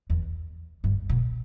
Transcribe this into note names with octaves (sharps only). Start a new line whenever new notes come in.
E2
G2
B2